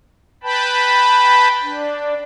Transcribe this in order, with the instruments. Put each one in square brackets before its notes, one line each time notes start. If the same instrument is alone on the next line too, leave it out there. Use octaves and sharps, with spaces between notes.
[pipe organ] B4 G5 A5 B5
D4